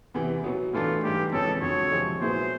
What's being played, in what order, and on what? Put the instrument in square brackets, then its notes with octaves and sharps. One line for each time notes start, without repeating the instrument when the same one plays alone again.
[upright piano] E2 C3 E3
B2 F#3 B3
[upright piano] A2 E3 A3 D4 [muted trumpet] F4
[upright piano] G#2 E3 G3 [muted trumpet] G4
[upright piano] F2 C#3 E3 G#3 C#4 [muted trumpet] A4
[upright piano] F2 D3 F#3 [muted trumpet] C#5
[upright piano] C3 F3 G#3 C4
[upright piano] A#2 F#3 B3 E4 G#4 [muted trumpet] C5